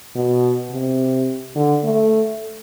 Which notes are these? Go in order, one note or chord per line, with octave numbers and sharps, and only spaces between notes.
B2
C3
D3
A3